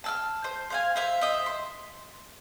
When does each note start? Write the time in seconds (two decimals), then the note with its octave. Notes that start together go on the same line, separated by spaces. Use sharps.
0.04 A5 E6 F6
0.44 C5
0.70 C5 F5 G#5
0.96 C5 E5 F5
1.21 C5 D#5 E5
1.46 C6